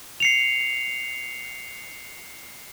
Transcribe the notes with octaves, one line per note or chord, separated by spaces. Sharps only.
C7 C#7 F7